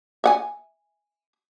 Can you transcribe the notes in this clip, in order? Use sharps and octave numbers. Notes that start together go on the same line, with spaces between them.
E5 F#5 G#5